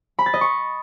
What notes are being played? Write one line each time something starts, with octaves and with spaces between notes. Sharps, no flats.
B5
A6
D#5
C#6